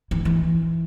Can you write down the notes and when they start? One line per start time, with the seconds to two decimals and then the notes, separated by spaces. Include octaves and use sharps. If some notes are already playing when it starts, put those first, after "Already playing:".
0.11 E3
0.25 E3